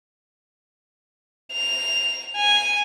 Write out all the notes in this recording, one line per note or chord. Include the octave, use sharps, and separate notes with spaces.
F7
G#5